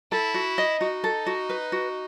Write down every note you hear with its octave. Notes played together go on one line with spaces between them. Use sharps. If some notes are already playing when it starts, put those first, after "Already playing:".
E4 A4
F#4
D#5
D#4 F#4
A4
F#4
B4
F#4